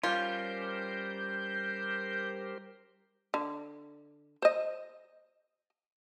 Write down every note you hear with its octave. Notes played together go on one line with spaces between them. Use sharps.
G3 C#4 F4 G4 A#4 C5 G6
D3
C5 D#5